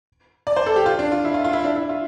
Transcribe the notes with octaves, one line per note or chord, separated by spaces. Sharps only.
D5
C5
A4
G4
F4
D4
F4
E4
F4
F4
E4
D4
E4
F4